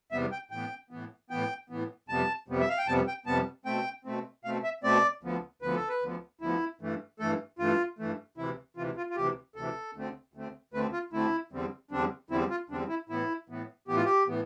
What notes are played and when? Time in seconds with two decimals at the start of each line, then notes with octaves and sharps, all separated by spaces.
0.12 E2 C3 G3 B3 E5
0.32 G5
0.51 A2 E3 B3 G5
0.90 A2 E3 B3
1.30 A2 E3 B3 G5
1.70 A2 E3 B3
2.09 F2 C3 G3 B3 A5
2.48 F2 C3 G3 B3
2.60 E5
2.69 F5
2.78 G5
2.87 F2 C3 G3 B3 A5
3.08 G5
3.26 F2 C3 G3 B3 A5
3.66 B2 A3 C4 G5
4.05 B2 A3 C4
4.45 B2 A3 C4 F5
4.64 E5
4.84 B2 A3 C4 D5
5.23 D2 D3 F3 B3
5.62 D2 D3 F3 B3 B4
5.75 A4
5.89 B4
6.02 D2 D3 F3 B3
6.41 D2 D3 F3 B3 E4
6.81 G2 E3 A3
7.19 G2 E3 A3 A4
7.59 G2 E3 A3 F4
7.99 G2 E3 A3
8.37 D2 C3 E3 E4
8.77 D2 C3 E3 F4
8.96 F4
9.10 F4
9.16 D2 C3 E3 G4
9.56 D2 C3 E3 A4
9.95 D2 D3 A3 C4
10.34 D2 D3 A3 C4
10.73 D2 D3 A3 C4 B4
10.93 F4
11.13 D2 D3 A3 C4 E4
11.52 E2 D3 G3 C4
11.91 E2 D3 G3 C4 D4
12.30 E2 D3 G3 C4 E4
12.50 F4
12.70 E2 D3 G3 C4 D4
12.89 E4
13.09 A2 E3 B3 E4
13.49 A2 E3 B3
13.88 A2 E3 B3 G4
13.96 F4
14.05 G4
14.27 A2 E3 B3